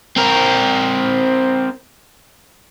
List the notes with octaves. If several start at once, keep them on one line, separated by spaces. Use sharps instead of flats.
C4 A#4